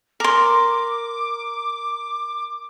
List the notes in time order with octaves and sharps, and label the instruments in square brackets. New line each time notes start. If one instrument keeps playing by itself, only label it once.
[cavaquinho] A#4 C6 [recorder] D6